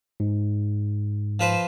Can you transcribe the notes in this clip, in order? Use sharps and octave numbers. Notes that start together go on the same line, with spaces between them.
G#2
F3 B4 C5